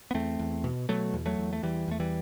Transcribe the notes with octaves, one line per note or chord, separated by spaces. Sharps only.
B3
E2 A3 C4
E2
B2
B2 F#3 A3
E2
F#3 A3
E2
A3
E2 E3 G3
E2 A3
E3 G3